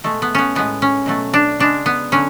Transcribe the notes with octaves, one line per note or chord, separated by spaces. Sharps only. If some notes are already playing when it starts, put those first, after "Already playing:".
B2 G#3 A3
B3
B3 C#4
A2 G#3 B3
C#4
B2 F#3 A3
D4
C#3 G#3 D4
B3
D3 F#3 C#4